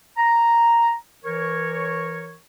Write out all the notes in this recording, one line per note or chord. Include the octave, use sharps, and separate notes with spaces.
A#5
E3 A#4 C#5